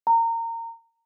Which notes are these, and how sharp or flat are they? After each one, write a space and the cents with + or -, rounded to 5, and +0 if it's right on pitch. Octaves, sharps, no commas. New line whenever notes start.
A#5 -25